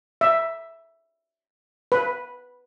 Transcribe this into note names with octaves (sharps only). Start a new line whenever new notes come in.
E5
B4